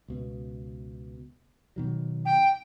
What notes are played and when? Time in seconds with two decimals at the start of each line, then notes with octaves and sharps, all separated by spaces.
0.08 C#2 B2
1.76 B2 D#3 F#3
2.25 G5